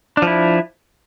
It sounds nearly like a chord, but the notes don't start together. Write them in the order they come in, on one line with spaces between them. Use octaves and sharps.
D4 F3 E4